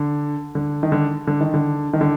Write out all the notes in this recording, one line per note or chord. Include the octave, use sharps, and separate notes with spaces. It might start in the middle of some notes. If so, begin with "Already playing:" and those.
Already playing: D3
D3
D#3
D3
D3
D#3
D3
D#3
D3